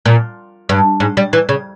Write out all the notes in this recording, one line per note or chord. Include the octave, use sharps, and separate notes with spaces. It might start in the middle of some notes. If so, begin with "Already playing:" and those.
A#2
G2
G#2
G3
E3
C#3